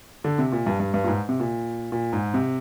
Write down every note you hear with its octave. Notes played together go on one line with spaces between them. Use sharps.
D3
C3
A#2
G2
G2
G2
A#2
G#2
C3
A#2
A#2
G#2
C3